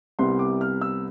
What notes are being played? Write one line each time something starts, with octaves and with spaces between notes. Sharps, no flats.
C2 C3 G3 B3 C6
D6
F6
E6